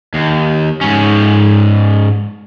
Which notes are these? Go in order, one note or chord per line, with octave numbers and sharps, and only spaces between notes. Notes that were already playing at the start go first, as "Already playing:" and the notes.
D#2
G#2 C#4